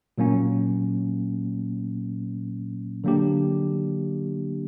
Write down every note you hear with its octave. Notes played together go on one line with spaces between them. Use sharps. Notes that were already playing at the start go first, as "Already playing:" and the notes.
A#2 F#3 A#3 C#4
D3 F#3 A#3 D4 G4